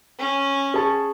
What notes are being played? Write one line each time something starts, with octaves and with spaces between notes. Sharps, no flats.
C#4
G#4 A5 C#6